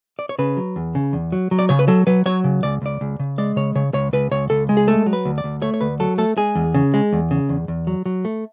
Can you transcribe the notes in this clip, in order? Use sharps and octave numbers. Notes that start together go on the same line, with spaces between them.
D5
C#5
C#3 B4
F#3
E2
C#3
E2
F#3
F#3
D5
C#3 C#5
B4
F#3 A4
F#3 B4
F#3 C#5
C#3
C#2 D5
C#2 D5
C#2
C#3
G#3 D5
C#3 C#5
C#3 C#5
C#2 C#5
C#2 B4
C#2 C#5
C#2 A4
G#3
G#4
A3 A4
F#3
B4
D2
D5
D2
A3 C#5
C#5
D2 B4
F#3 A4
A3 A4
G#3 G#4
E2
C#3
G#3
E2
C#3
E2
E2
F#3
F#3
A3